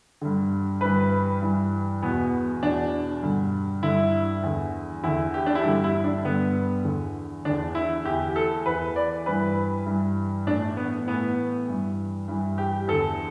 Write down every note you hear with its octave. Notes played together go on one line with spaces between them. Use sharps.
G2 D3
G2 E3 B4
G2 E3
E2 B2 B3
E2 B2 D4
G2 D3
G2 D3 E4
E2 D3
E2 D3 E4
G4
D4
E4
G2 D3 G4
E4
D4
G2 D3 B3
E2 D3
E2 D3 D4
E4
E2 E3 G4
A4
E2 E3 B4
D5
G2 E3 B4
G2 E3
A2 E3 D4
B3
A2 E3 B3
G2 E3
G2 E3
G4
E2 D3 A4